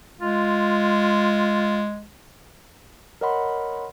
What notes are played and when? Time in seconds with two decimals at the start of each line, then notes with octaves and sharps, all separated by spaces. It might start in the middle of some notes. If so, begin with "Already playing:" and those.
0.21 G#3 F4
3.21 A#4 C#5 D#5 F#5 B5 C6